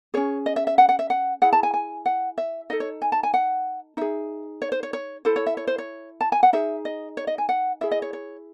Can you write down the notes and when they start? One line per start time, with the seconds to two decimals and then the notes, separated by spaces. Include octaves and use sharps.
0.14 C#4 G#4 C#5
0.46 D#5
0.56 E5
0.67 E5
0.78 F#5
0.89 F#5
0.99 E5
1.10 F#5
1.42 E4 G#4 F#5
1.53 A5
1.63 G#5
1.74 G#5
2.06 F#5
2.38 E5
2.70 D#4 A4 D#5
2.80 C#5
3.02 G#5
3.12 A5
3.23 G#5
3.34 F#5
3.97 D#4 G#4 E5
4.62 C#5
4.72 C5
4.83 C#5
4.93 C#5
5.25 E4 A4 C5
5.36 C#5
5.46 E5
5.57 C#5
5.67 C5
5.78 C#5
6.21 A5
6.32 G#5
6.43 F#5
6.53 D#4 G#4 E5
6.85 D#5
7.17 C#5
7.27 D#5
7.38 G#5
7.49 F#5
7.81 E4 G#4 E5
7.91 D#5
8.02 C#5
8.13 C#5